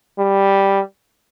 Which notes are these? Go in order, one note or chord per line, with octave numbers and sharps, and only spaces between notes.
G3